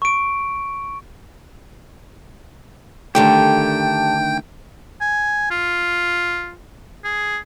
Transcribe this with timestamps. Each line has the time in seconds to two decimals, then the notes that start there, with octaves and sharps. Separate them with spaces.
0.02 C#6 D7
3.15 D3 D#3 A3 D4 G4 G5
5.01 G#5
5.51 F4
7.05 G#4